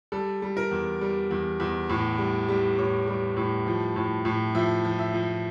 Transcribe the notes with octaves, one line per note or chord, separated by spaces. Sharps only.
G3 A4
G3
A#4
E2
G3
E2
E2
A2
G3
G3
A2 C#5
G3
A2
F3
A2
A2
F3 E5
F3
E5
F3